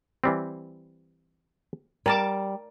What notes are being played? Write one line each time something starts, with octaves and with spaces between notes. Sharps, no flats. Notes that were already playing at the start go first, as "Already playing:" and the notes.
E3 G3 C4
G3 A#4 A5 D6